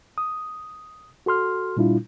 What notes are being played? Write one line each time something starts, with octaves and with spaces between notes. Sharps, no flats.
D#6
F#4 A4 C6 F6
A#2 G3 D4 E4 F4